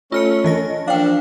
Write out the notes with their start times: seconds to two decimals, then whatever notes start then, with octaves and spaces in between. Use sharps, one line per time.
0.12 A3 C#4 F4 F6 C#7
0.44 E3 D#5 A#6
0.88 F3 A#3 D4 F5 G5